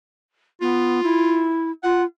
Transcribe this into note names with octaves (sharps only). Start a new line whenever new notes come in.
B3 F4
E4
F4 F#5